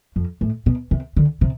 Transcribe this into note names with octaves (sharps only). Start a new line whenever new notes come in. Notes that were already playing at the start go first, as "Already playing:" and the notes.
F2
A2
B2
C3
D3
C3